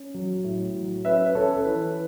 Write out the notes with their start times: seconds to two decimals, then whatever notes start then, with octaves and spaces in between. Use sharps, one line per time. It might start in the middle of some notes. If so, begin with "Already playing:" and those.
Already playing: C#4
0.14 F#3
0.44 A2
0.75 F#3
1.05 C#4 B4 E5
1.26 B4
1.35 C#4 A4 C#5
1.65 E3 B4